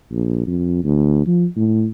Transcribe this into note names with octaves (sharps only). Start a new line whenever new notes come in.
A#1
F2
D2
F3
A2